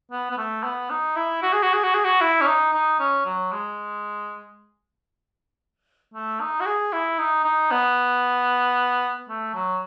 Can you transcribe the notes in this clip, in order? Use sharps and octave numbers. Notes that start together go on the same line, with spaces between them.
B3
B3
A3
B3
D#4
E4
F#4
G#4
F#4
G#4
F#4
G#4
F#4
E4
C#4
D#4
D#4
C#4
F#3
G#3
A3
D#4
F#4
G#4
E4
D#4
D#4
B3
A3
F#3